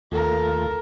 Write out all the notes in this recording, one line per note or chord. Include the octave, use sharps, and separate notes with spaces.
D#2 A3 F4 A4 A#4